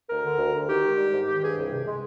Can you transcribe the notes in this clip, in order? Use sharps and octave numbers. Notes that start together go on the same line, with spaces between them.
D2 A#4
D3
D2
D2
D#3 G4
G#3
G3
G#2
D#3 G4
G2 G#4
C2
C3
G#3